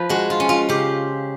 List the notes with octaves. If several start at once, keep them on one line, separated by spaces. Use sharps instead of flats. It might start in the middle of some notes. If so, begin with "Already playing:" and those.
Already playing: F3 B4
G#3 F#4
F4
C#4
F4
C#3 G4